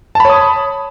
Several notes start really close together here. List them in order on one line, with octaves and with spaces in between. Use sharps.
A5 B5 C#5 D#6